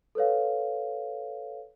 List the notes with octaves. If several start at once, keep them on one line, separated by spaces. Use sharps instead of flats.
A4 B4 C#5 F5